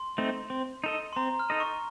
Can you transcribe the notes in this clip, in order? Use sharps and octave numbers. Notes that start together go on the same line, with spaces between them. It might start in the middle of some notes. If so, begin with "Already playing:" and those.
Already playing: C6
A3 C4 D#4
C4
D#4 A4 D#5
C6
C4 A#5
F6
D#4 A4 D#5
C#6